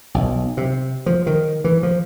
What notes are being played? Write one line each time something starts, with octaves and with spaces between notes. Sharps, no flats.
B1
C3
F3
D#3
E3
F3